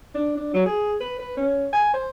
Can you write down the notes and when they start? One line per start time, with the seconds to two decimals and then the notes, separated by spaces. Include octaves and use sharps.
0.15 D4
0.37 D4
0.54 F#3
0.65 G#4
1.00 B4
1.19 B4
1.37 C#4
1.73 G#5
1.94 C5